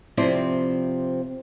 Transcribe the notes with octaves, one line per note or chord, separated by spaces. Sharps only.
C3 F3 C4 E4 C5 D5